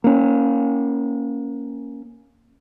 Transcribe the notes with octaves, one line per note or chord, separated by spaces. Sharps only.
A#3 C#4